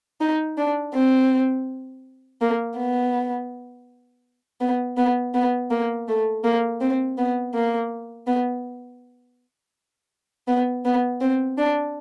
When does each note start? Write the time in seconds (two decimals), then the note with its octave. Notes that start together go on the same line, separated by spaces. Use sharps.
0.21 D#4
0.58 D4
0.94 C4
2.41 A#3
2.77 B3
4.61 B3
4.97 B3
5.34 B3
5.71 A#3
6.08 A3
6.44 A#3
6.81 C4
7.18 B3
7.55 A#3
8.27 B3
10.48 B3
10.85 B3
11.21 C4
11.58 D4